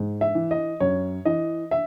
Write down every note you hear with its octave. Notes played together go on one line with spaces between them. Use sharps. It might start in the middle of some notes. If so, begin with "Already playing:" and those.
Already playing: G#2
E5
E3
D#5
F#2 C#5
E3 D#5
E5